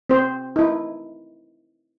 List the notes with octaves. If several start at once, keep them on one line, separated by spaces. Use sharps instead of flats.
C4 C5
D#4 E4